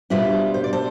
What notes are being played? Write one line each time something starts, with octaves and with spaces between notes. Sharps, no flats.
B2 G3 D4 F4 C5 E5
C5
D5
A4 C5